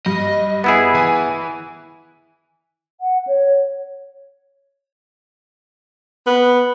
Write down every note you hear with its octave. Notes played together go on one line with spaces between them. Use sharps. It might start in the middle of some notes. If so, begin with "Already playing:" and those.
G2 D#5
B3 E4 G#4
E3 G#5
F#5
C#5
B3